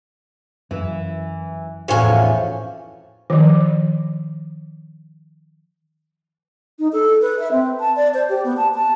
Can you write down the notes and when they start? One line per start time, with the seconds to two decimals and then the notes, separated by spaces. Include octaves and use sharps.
0.71 F#2 E3
1.88 E2 A2 F3 C4 C#4 F#4 C#5 G#5
3.30 D#3 F3
6.79 D#4
6.92 A4
7.21 B4
7.39 E5
7.52 C4
7.80 A5
7.96 D5
8.14 C5
8.29 G4
8.44 B3
8.57 A5
8.74 A5